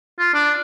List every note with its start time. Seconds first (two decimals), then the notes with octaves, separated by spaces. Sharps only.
0.19 F4
0.35 D4